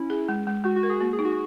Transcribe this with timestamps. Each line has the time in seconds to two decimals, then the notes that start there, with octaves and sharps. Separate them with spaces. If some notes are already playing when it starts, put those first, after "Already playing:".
Already playing: C#4 E4
0.10 G#4
0.29 G#3
0.47 G#3
0.64 G#3 F#4
0.76 F#4
0.83 A#4
0.89 G#4
1.01 A#3 F#4
1.13 G#4
1.19 D#4
1.25 F#4